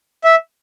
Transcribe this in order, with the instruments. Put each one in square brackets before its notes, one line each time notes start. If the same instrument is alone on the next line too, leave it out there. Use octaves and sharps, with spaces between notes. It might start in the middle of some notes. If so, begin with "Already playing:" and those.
[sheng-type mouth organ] E5